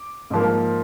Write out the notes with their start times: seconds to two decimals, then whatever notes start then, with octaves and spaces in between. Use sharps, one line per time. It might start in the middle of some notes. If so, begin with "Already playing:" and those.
Already playing: D6
0.30 G#2 F3 A#3